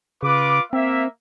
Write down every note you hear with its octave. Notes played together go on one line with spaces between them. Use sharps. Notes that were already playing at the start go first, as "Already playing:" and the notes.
C#3 F4 B4 D6
A#3 C4 E5